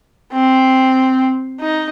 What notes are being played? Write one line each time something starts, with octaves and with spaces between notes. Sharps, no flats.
C4
D#4